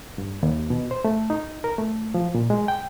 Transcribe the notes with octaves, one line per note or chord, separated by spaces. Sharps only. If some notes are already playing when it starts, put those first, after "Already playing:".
G2
D#2
B2
C5
A3
D#4
A#4
A3
F3
A#2
G#3
G5